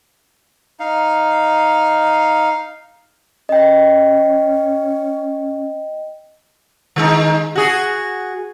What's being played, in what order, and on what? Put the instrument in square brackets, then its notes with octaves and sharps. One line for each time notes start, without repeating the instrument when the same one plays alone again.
[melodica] D#4 F5
[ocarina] C#4 [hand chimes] D#5 G5
[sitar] D#3 G#3 D#4
F#4 G#4